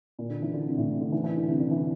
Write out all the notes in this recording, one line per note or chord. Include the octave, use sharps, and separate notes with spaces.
A#2
D3
E3
D3
C3
A2
C3
D3
E3
E3
D3
C3
D3
E3